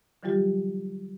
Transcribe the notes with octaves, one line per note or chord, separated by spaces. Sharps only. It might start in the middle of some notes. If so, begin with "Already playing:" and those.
D3 E3 F#3 G3 F4 G4